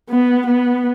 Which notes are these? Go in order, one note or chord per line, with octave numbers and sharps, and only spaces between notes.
B3
B3